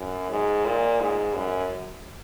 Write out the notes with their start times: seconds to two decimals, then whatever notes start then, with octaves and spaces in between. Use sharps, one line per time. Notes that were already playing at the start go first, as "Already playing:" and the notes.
Already playing: F#2
0.30 G#2
0.65 A#2
1.01 G#2
1.35 F#2